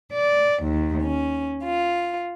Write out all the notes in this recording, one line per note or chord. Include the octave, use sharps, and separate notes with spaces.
D5
D#2
C#4
F4